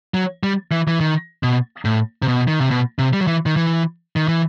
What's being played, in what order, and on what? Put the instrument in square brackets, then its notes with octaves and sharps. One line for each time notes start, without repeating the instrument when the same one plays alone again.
[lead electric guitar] F#3
G3
E3
E3
D#3
B2
A2
C3
B2
D#3
C3
B2
C3
G3
F#3
E3
D#3
E3
D#3
E3